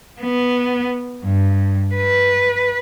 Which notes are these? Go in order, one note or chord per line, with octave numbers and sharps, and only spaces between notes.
B3
G2
B4